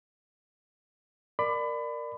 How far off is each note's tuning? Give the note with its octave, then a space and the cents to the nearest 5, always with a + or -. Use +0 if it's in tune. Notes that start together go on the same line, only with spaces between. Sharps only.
A#4 +0 D5 +15 B5 +30